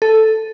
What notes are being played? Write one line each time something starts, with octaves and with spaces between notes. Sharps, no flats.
A4